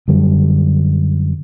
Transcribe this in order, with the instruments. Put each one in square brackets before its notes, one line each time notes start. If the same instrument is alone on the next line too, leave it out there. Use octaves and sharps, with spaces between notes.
[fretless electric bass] F#2 D3 G3